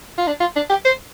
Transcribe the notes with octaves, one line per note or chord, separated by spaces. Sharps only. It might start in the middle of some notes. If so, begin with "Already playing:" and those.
F4
D4
F4
D4
G4
C5